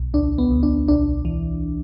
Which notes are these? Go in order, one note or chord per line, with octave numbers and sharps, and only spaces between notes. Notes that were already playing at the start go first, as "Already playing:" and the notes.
Already playing: B1
D2 D4
B3
D2
D4
B1 D4
E3